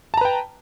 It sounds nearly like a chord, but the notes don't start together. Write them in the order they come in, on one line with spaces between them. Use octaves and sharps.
A5 A#5 B4 G5